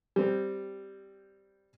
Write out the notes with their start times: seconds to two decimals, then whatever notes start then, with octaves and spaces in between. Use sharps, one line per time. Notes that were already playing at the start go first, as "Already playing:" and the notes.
0.16 G3 C4